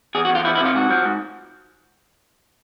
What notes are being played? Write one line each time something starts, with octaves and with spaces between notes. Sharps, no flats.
E2 G#4
F#4
E2
F4
F3 E4
E4
C3
F4
G#2 F#4
F3
G#2